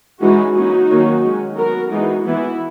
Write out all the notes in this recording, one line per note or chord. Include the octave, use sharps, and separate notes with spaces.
E3 G#3 C#4 D#4 F#4
F#3 A#3 C#4 D#4 F#4
D#3 F#3 A#3 C#4
D#3 G#3 C#4
F#3 B3 F#4 A#4
E3 G#3 B3 D#4 F#4
E3 B3 E4